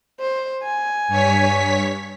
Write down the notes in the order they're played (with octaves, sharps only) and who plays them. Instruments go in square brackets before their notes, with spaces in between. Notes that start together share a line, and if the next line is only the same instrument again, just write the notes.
[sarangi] C5
G#5
[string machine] G2 C#5 B6